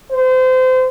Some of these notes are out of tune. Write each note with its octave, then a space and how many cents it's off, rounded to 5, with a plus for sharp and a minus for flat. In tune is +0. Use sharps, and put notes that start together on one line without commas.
C5 -30